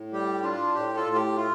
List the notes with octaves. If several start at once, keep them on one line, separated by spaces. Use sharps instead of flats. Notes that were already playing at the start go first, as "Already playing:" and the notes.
Already playing: A2
G3 G4
D4 F4
A2 G4
F4 A4
A2
G4
A3 F4